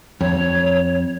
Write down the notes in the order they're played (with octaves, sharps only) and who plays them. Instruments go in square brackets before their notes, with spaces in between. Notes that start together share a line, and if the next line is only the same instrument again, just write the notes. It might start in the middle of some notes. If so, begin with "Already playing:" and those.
[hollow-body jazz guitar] F2 [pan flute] C#5